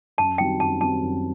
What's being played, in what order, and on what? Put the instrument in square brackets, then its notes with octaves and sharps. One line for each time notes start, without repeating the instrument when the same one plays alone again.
[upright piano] F#2 [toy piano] A5
[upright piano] D#3 G3 C4 F#4 [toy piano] G5
[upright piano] F#2 [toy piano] A5
[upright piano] D#3 G3 C4 F#4 [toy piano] A5
[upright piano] F#2